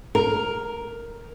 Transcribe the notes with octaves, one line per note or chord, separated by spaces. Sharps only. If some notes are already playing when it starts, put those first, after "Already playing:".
A#4